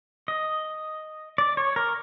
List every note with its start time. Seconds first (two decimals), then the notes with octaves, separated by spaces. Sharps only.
0.28 D#5
1.38 D5
1.57 C#5
1.76 A#4